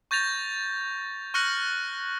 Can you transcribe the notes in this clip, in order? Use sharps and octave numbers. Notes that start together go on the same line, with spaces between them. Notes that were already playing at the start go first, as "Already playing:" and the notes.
C#6 G6 A6 A#6 F7
C#6 F6 F#6 A#6 C#7 F#7